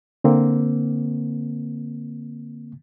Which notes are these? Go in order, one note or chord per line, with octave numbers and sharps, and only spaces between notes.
D3 A#3 C4